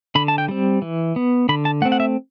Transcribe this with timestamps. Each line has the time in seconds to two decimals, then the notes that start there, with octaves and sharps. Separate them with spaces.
0.15 D3 B5
0.28 A5
0.38 G5
0.48 G3 C4
0.82 E3
1.16 B3
1.49 D3 B5
1.65 A5
1.82 A3 F#5
1.85 C4
1.92 F#5
2.00 E5